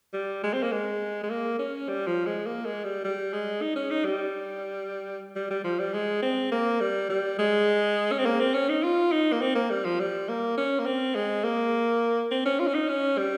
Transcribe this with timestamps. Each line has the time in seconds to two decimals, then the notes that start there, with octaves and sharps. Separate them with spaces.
0.14 G3
0.44 G#3
0.53 C4
0.63 A#3
0.72 G#3
1.23 G#3
1.30 A#3
1.59 C#4
1.88 G3
2.07 F3
2.26 G#3
2.46 A#3
2.65 G#3
2.84 G3
3.04 G3
3.33 G#3
3.62 D#4
3.76 C#4
3.90 D#4
4.05 G3
5.36 G3
5.50 G3
5.64 F3
5.79 G3
5.94 G#3
6.22 C4
6.52 A#3
6.80 G3
7.09 G3
7.38 G#3
8.12 C#4
8.19 C4
8.25 A#3
8.40 C4
8.54 C#4
8.69 D#4
8.83 F4
9.12 D#4
9.32 A#3
9.42 C4
9.55 A#3
9.70 G3
9.84 F3
10.00 G3
10.29 A#3
10.57 C#4
10.79 A#3
10.86 C4
11.15 G#3
11.44 A#3
12.31 C4
12.46 C#4
12.59 F4
12.67 C#4
12.74 D#4
12.89 C#4
13.18 G3